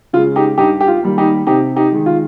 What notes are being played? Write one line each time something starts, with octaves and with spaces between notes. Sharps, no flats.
C#3 G#3 F4
D#4 G4
G2 D#4 G4
G4
F4
D#3 G3 A#3
D#4 G4
C3 D#4 G4
D#4 G4
D#3 G#3
F4